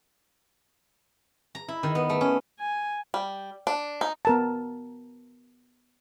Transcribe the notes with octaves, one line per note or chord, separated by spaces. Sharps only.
A#5
E4
D#3
B3
A3
C#4
G#5
G3
D4
D#4
B3 A#4 A5